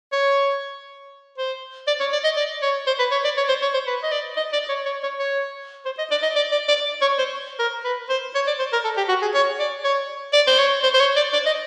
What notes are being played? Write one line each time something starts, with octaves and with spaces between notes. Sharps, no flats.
C#5
C5
D5
C#5
D5
D#5
D5
C#5
C5
B4
C#5
D5
C#5
C5
C#5
C5
B4
D#5
D5
D#5
D5
C#5
C#5
C#5
C#5
C5
D#5
D5
D#5
D5
D5
D5
C#5
C5
A#4
B4
C5
C#5
D5
C5
A#4
A4
G4
F#4
G#4
C#5
D5
C#5
D5
C5
C#5
C5
C5
C#5
D5
D5
D#5